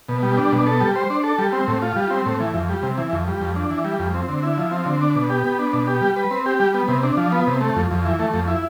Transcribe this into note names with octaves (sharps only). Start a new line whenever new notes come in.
B2
G3
D4
B2
A4
G3
C5
D4
A4
G3
C4
A2
F4
G3
C4
A2
E3
F2
G3
C3
E3
F2
G3
F2
D4
E3
G3
F2
C4
D3
E4
F3
C4
D3
D4
B2
G4
B3
D4
B2
G4
G3
B4
C4
G4
G3
B3
C3
D4
F3
B3
C3
A3
F2
F2
E3
A3
F2
E4